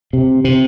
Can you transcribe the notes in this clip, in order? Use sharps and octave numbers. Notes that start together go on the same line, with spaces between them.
C3
C3